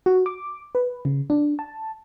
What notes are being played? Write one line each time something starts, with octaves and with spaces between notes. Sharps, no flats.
F#4
D6
B4
C#3
D4
A5